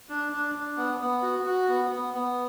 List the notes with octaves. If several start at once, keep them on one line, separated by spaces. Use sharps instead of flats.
D4
D4
D4
B3
B3
F#4
F#4
B3
B3
B3